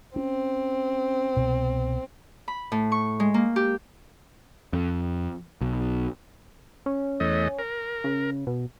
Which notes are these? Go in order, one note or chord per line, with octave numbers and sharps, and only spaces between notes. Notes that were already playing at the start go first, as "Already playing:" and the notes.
C4 C#4
C2 B2
B5
A2
C#6
G#3
A#3
G4
F2
B1
C#4
E2 A3 D#5
A#4
C#3
B2